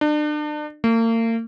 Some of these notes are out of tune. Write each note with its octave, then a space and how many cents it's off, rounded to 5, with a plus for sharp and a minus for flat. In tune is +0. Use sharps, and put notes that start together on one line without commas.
D4 +35
A#3 -40